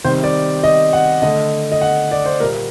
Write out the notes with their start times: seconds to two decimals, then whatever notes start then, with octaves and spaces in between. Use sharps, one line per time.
0.04 C3 D#3 G3 C5
0.24 D5
0.63 D#5
0.93 F#5
1.22 D3 A3 D#5
1.72 D#5
1.81 F#5
2.11 D5
2.26 C5
2.40 A#2 G3 A#3 A#4